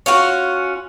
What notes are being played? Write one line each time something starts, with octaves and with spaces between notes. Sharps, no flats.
C#4 F4 F#4